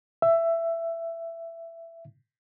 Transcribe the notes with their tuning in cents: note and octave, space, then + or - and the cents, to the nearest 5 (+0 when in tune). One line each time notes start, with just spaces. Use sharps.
E5 +15